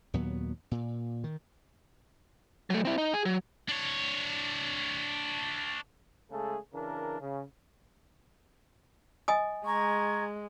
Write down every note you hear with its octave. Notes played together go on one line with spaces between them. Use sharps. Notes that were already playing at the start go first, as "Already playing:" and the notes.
D#2 A#2 F#3 B3
A#2
D#3
F#3 A3
C4 E4
D#4
G#4 G#5
F#3
D4 C#5
C#3 G#3 A3 G#4 A4
C#3 E3 D4 A#4
C#3
D#5 G#5 D#6
G#3 A#5 C#6 G#6